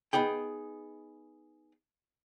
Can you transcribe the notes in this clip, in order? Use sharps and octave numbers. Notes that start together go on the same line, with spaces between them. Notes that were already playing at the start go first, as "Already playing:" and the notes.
B3 D#4 G#4 G5